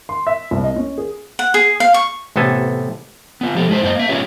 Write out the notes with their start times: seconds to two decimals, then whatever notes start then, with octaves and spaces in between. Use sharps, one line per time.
0.09 C6
0.27 E5
0.51 C2
0.64 D#5
0.76 C#4
0.98 G#4
1.39 F#5
1.54 G#4
1.80 F5
1.94 C#6
2.36 A1 C3 B3 A4 G#5
3.41 B3 F4
3.55 F3 G4 A4
3.69 G#3 E4 C5
3.82 F#2 A#3 C4 C5 D#5
3.95 A#3 E5
4.09 C#4 F4 G4 G#4 B4 C#5